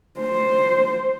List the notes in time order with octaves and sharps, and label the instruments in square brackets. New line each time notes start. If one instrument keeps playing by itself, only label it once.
[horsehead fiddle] C5